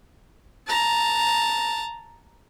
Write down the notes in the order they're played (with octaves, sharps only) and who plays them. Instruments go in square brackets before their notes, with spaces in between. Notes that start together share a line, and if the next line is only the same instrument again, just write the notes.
[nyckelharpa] A5 A#5